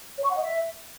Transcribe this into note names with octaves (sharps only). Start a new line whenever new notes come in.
C#5
C#6
F#5
D#5
E5